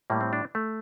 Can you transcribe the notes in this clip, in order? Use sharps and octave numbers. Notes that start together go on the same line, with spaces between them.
A2 G3 A#3
C4
D4
A3